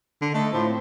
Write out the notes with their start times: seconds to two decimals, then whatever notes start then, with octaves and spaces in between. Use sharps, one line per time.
0.22 D3
0.34 A3 A4 D#5
0.53 A2 F4 C5
0.66 C4